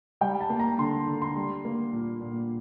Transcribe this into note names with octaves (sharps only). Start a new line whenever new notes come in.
G3 G5
A5
A#3
A#5
D3 C6
D3
C6
G3
A#3
A#2
A#2